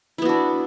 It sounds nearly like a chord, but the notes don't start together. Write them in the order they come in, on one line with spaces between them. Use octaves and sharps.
E4 B3 F#4 D4